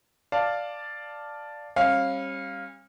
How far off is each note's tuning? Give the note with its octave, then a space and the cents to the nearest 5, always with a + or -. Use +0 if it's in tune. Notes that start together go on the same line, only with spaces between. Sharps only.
D5 +0 F5 +0 A5 +0
G3 +0 C#4 -40 F5 +0